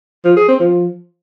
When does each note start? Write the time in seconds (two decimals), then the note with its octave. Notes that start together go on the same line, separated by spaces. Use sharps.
0.25 F3
0.36 G#4
0.48 C4
0.60 F3